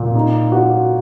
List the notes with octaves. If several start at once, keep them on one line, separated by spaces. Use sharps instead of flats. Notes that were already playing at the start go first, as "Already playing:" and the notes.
Already playing: A#2
D#4
F#4